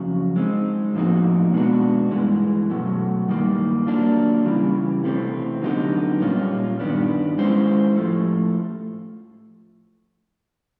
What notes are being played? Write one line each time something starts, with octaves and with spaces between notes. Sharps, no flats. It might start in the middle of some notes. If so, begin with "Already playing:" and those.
Already playing: F2 C#3 F#3
G#3 C4 D#4
A2 F3 A#3 D#4 F#4
B2 G#3 B3 D4 F#4
G2 E3 G#3
B2 F#3 A3
G2 D#3 G3 A#3
F#3 A#3 D4 F4
C#3 E3 G3
C3 E3 A3 C4
D3 F#3 B3 D#4 G4
A#2 G3 A#3 C#4 F4
G2 D#3 G3 B3 D4
G#3 C#4 E4 G4 C5
A2 F3 A3